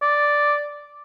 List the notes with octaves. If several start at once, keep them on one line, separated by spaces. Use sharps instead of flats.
D5